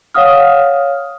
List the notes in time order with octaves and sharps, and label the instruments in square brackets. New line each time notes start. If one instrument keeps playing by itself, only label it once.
[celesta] C#5 F5 F#5 D#6 F6